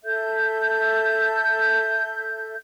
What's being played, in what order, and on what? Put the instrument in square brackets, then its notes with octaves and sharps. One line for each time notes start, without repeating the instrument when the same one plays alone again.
[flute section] A4 E5 G6